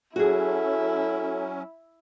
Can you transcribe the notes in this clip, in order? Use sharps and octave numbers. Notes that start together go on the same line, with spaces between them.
F#3 C#4 E4 F#4 G#4 A4